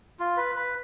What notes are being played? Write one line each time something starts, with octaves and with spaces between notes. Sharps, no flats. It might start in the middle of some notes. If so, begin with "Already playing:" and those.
F4
B4
B4